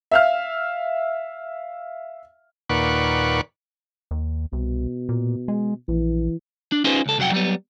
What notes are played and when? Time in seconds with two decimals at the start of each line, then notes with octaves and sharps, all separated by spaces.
0.11 E5 F5 F6
2.69 D#2 A#2 B4 D5 F#5 C#6
4.11 D#2
4.53 C2 B2
5.09 A#2
5.48 G#3
5.88 A#1 E3
6.72 D4
6.84 C#4 D#4 F4 G#4 B4 C5
7.06 C#2 A4
7.18 C2 F2 F#3 B4 F#5 G5
7.32 F#3 G3 B3